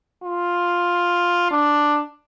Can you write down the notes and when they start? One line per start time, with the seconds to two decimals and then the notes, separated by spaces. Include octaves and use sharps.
0.24 F4
1.51 D4